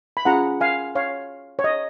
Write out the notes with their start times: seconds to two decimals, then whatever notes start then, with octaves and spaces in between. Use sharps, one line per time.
0.17 B5
0.25 C#4 F4 G#4 F#5 A#5
0.61 F5 G#5
0.95 C#5 F5
1.59 C#5
1.64 D#5